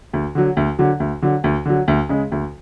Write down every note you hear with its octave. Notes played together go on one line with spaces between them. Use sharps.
D2
D3 F#3
D2
D3 F#3
D2
D3 F#3
D2
D3 F#3
D2
C#3 G#3
D2